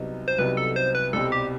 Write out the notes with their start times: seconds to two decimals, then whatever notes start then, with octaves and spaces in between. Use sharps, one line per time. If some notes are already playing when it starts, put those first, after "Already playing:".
Already playing: C2 C3 F#3 B3 D#4
0.28 C5
0.38 C2 C3 F#3 B3 D#4 B4
0.57 A4
0.76 C5
0.95 B4
1.13 C2 B2 G3 C4 A4
1.32 G4